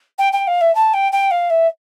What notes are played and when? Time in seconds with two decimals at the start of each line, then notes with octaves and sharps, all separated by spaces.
0.18 G5
0.33 G5
0.47 F5
0.61 E5
0.75 A5
0.93 G5
1.12 G5
1.31 F5
1.50 E5